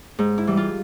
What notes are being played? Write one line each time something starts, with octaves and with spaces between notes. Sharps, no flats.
G#2
E4
E3 G3
F4